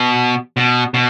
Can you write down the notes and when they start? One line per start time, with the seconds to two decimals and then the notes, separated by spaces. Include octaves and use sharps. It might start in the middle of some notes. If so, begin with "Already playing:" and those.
Already playing: B2
0.57 B2
0.94 B2